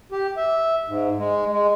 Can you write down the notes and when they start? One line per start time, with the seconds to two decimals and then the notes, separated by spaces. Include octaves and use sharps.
0.12 G4
0.37 E5
0.88 G#2
1.19 G#3
1.52 G#3